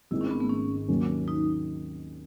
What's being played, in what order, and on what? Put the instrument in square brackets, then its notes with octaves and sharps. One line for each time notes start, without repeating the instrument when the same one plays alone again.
[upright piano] G#1 G#2 D#3 G#3 D#4 [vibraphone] E4
[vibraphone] C#4
B3
A3
C#4
[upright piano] D#2 D#3 F#3 C#4
[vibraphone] D#4